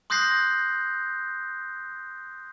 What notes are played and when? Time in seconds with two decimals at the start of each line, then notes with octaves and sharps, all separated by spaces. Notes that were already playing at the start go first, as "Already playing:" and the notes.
0.10 C6 D#6 F#6 G6 A#6 C7